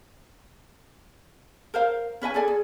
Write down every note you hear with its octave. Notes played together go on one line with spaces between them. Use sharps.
A#4 C5 F5
C#4 B4 D#5 G#5
G#4 A4 D5 G#5
G#4